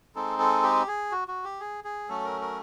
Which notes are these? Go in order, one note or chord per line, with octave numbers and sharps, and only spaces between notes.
G#3 C4 D#4 A4
A4
G4
G#4
F#4
F#4
G4
G#4
G#4
F#3 A3 C#4 A4
A#4
A#4